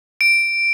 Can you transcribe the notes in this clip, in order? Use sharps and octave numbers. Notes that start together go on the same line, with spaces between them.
D7